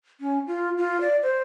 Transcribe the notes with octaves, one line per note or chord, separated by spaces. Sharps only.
C#4
F4
F4
D5
C5